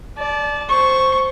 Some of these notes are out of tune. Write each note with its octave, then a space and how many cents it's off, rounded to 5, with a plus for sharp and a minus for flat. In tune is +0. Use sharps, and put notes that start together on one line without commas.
D5 -5 A5 -25
C5 +0 C#6 +0